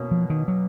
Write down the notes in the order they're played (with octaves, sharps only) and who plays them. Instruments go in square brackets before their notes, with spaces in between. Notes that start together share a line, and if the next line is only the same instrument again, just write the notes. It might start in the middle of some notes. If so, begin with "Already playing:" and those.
Already playing: [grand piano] B2 A#3 C#4
[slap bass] F3
D#3
F#3